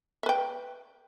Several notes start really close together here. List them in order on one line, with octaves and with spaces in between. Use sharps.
E5 B4 G5